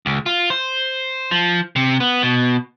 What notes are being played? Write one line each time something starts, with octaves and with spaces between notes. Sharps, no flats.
C#2
F4
C5
F3
C3
B3
B2